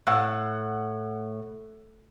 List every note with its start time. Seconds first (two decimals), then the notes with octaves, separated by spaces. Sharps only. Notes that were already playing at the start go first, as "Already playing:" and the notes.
0.07 A2 F#5 E6 F#6